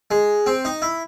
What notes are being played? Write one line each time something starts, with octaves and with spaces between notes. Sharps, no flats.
G#3
C4
D#4
E4